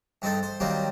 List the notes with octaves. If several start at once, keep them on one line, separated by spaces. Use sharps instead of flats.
G2 C4 D#4 A4
C5
D#3 F#3 G3 A#3 C4